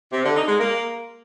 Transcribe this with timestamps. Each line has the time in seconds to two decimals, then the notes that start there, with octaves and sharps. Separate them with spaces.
0.13 C3
0.24 D3
0.36 D#4
0.48 G#3
0.60 A#3